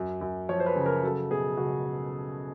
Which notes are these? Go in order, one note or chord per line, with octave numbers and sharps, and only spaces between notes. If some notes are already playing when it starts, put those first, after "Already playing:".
Already playing: F#2
F#2
F3 C#5
C5
B4
C#3
A#4
F#3 A4
B2 G#4
C#2 F#4